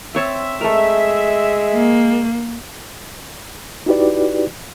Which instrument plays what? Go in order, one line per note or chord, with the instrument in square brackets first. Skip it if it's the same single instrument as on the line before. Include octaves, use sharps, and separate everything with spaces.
[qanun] C4 C#5 A5 [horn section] E5
[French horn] G#3 [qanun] A3 A#4
[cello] A#3
[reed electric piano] D#4 E4 F#4 G4 B4 D5